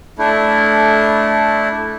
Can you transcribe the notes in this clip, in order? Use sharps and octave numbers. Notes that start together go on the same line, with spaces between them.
A3 D4 E4